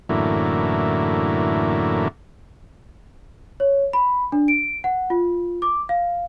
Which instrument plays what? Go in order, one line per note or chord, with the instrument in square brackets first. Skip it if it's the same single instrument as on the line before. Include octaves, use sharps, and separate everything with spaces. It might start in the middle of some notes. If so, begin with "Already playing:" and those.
[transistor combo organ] F#2 A2 D3 E3 A#3
[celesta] C#5
B5
D4
D7
F#5
F4
D6
F5